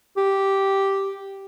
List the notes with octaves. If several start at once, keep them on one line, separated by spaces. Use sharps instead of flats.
G4